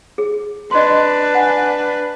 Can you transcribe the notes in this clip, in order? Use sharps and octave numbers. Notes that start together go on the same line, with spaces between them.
G#4
D4 B4 D#5 C6
F#5 G#5